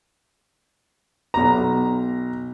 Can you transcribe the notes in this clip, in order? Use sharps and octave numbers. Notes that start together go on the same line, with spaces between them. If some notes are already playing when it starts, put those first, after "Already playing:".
B1 A#5